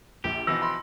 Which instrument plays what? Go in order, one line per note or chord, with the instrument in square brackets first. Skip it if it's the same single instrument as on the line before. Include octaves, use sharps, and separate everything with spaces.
[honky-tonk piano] A#1 [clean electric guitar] G4
[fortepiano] B2 E3 F3 [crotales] E6 [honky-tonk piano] A#6
[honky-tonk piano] B5 C6